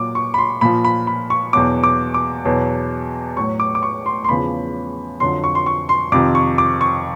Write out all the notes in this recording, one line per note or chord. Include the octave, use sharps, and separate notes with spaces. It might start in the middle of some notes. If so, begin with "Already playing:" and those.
Already playing: A#2 F#3 D6
C#6
B5
C6
A#2 F3 B5
B5
B5
C#6
E2 B2 F#3 D6
D6
D6
E2 B2 F#3
A2 F#3 C#6
D6
D6
C#6
C6
C6
E2 C#3 F3 B5
F2 D3 F#3 C6
C#6
C6
C#6
C6
F2 C3 D#3 D6
C#6
D6
C#6